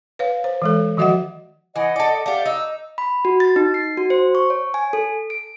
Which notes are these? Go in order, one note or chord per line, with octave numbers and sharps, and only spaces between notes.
B4 C#5 F5
C5
E3 G#3 A4
D#3 F3 F#4 D#5 E5 F#5
E3 D#5 F#5
A4 D5
A3 G4 D5 F5 F#5
D#4 E6
B5
F#4
A6
D#4
C7
F#4
C5
C#6
C#5
G#5
A4
D7